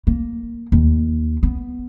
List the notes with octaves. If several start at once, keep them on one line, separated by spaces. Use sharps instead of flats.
A#3
D#2
B3